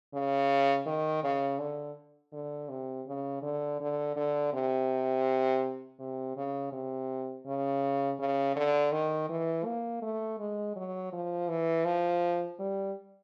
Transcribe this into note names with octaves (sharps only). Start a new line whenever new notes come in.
C#3
D#3
C#3
D3
D3
C3
C#3
D3
D3
D3
C3
C3
C#3
C3
C#3
C#3
D3
D#3
E3
A#3
A3
G#3
F#3
F3
E3
F3
G3